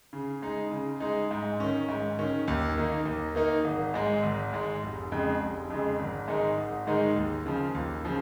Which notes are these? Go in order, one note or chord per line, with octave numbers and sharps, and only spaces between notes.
C#3
G#3 D#4
C#3
G#3 D#4
G#2
D#3 C#4
G#2
D#3 C#4
D#2
D#3 A#3 D#4
D#2
D#3 A#3 D#4
G#1
G#2 G#3
G#1
G#2 G#3
F1
F2 C#3 G#3
F1
F2 C#3 G#3
G#1
G#2 D#3 G#3 D#4
G#1
G#2 D#3 G#3 D#4
D#2
C#3 F3
D#2
C#3 F3